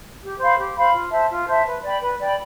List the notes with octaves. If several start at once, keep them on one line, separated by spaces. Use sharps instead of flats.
G4
C5 F5 B5
G4
C5 F5 B5
F4
C5 E5 A5
F4
C5 E5 A5
B4
D5 G5 B5
B4
D5 G5 B5